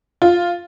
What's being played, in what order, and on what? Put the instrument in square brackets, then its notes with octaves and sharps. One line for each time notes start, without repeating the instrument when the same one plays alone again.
[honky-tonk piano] F4